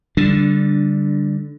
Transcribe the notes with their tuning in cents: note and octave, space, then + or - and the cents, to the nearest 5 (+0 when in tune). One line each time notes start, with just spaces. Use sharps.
D3 -15 G3 +0 D4 +0